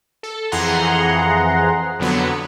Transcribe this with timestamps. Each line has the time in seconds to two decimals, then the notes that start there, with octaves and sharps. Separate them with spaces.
0.23 A4
0.52 F2 E3 G#4 F#5 A#5 C6
1.99 F2 D3 F#3 B3